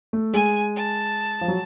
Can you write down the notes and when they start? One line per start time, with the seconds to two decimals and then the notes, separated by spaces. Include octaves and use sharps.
0.13 A3
0.33 G#3 G#5
0.75 A5
1.41 F3
1.48 F#3